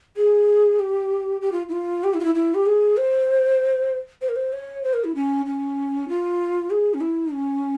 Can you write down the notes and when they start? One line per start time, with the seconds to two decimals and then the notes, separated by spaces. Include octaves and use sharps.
0.17 G#4
0.79 G4
1.41 G4
1.52 F4
1.69 E4
1.72 F4
2.04 G4
2.14 E4
2.20 F4
2.24 E4
2.35 E4
2.55 G4
2.66 G#4
2.97 C5
4.21 C5
4.29 A#4
4.36 C5
4.53 C#5
4.83 C5
4.94 A#4
5.04 E4
5.15 C#4
5.46 C#4
6.08 F4
6.70 G#4
6.94 C#4
7.01 E4
7.33 C#4